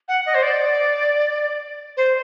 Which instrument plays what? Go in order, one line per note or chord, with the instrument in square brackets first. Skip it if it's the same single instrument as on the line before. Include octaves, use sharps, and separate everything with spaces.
[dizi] F#5
D#5
C5
D5
C5